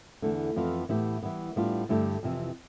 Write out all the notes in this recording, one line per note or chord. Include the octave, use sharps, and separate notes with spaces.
E2 D3 A3
F2 E3 B3 F4
A2 E3 B3 E4 G4
E3 G3 B3
A2 G3 B3 D4 F4
G2 D3 A3 E4 G4
F2 C3 E3